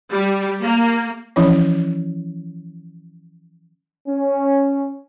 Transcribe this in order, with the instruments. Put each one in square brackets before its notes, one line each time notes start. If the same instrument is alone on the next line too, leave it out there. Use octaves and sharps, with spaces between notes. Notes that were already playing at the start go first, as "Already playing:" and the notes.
[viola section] G3
A#3
[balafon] E3 F3 C#4 E4 C#5
[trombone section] C#4